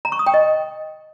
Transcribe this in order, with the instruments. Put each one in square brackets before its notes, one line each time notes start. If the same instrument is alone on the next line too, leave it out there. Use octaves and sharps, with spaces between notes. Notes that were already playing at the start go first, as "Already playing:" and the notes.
[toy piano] A#5
C#6
D#6
G5
D#5